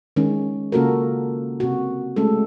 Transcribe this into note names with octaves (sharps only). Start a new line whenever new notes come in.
D#3 G#3 C#4
C#3 A#3 F4 F#4 A4 A#4
C3 F#4
G#3 A3 C#4 A4